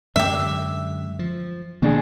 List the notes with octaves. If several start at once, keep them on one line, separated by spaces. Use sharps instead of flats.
F#2 D3 G#3 G4 E5
F3
B2 D#3 A#3 D4 G#4